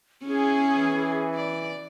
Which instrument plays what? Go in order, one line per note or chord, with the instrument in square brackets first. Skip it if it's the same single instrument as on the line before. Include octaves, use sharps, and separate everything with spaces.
[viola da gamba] C#4 E4 [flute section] G#4
[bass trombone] E3
[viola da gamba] D5